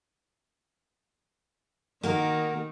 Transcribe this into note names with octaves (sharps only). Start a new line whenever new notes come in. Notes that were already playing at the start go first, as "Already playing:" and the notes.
D#3 A#3 F#4 A#4